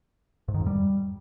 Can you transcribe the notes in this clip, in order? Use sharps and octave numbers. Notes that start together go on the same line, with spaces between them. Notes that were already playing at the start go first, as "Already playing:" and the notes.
G#2
D#3
F2
G3